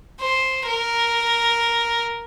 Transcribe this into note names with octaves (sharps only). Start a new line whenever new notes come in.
C5
A#4